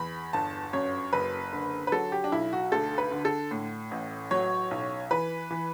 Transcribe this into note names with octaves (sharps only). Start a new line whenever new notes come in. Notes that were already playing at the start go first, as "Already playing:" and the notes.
Already playing: E2 B5
G1 A5
F#2 C#5
F#1 B4
D3
B4
F#3 A4
G4
D4
B1 E4
F#4
D2 A4
B4
D3
A4
A2
A1
F#3 C#5
B1
E3 B4
E3